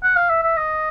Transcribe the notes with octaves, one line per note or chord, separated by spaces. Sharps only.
F#5
F5
E5
E5
D#5